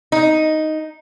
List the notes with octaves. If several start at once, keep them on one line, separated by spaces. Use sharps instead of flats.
D#4